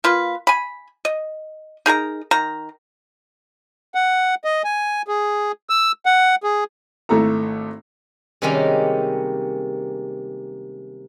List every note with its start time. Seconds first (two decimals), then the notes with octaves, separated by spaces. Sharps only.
0.04 A#3 F4 B4
0.47 G#5 B5
1.05 D#5
1.86 D#4 G#4 A#4 A#5
2.31 D#3 A#5
3.95 F#5
4.44 D#5
4.64 G#5
5.08 G#4
5.70 E6
6.06 F#5
6.43 G#4
7.09 G#1 A3 E4 A4 A#5
8.42 C3 D#3 G3 G#3 A#3 C#4